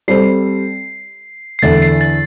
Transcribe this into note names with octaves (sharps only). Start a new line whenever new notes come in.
G3 C4 A4 C5 C7
C7
E2 D3 A3 E4 A6
C7
A6